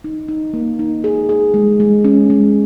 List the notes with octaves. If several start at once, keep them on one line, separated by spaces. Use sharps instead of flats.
D#4
D#4
A#3
D#4
G#4
G#4
G#3
G#3
C#4
G#3